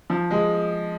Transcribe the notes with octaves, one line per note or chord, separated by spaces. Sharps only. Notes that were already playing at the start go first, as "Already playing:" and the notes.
F3
G#3